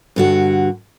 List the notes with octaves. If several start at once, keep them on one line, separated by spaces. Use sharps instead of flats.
G2 D3 F#4